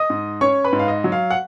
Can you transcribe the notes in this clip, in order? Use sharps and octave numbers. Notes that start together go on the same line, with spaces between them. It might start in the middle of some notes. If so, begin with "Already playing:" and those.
Already playing: D#5 D#6
G#2
C#4 C#5 C#6
B4 B5
G#2
F5
D#5
F#3
F5
F#5